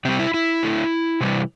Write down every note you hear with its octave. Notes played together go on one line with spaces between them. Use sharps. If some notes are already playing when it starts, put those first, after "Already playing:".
C3 G3 C4
E4
E4
D3 A3
C3 E3 G3